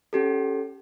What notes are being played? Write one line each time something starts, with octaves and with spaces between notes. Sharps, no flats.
C#4 G4 A4